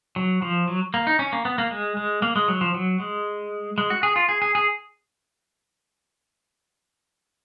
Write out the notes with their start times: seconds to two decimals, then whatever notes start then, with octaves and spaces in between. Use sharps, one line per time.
0.16 F#3
0.42 F3
0.68 F#3
0.94 A#3
1.07 D#4
1.19 C#4
1.33 A#3
1.45 B3
1.58 A#3
1.71 G#3
1.97 G#3
2.22 A#3
2.36 G#3
2.48 F#3
2.61 F3
2.74 F#3
3.00 G#3
3.78 G#3
3.90 F#4
4.03 G#4
4.16 F4
4.29 G#4
4.42 G#4
4.55 G#4